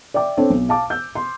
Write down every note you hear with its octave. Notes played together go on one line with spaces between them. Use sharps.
D5 E5 G5 D6
C4 D4 A4 C#5
B1
F5 A5 D6
E6 G6
C6